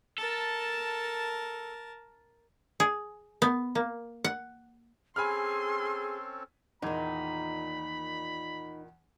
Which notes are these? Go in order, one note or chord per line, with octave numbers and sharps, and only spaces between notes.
A4 A#4 A5
G#4
B3
A#3
F#5
C4 C#4 G#4 A4 G#5 B5 C6 F6
E2 A#2 D#3 D#4 B5 G#6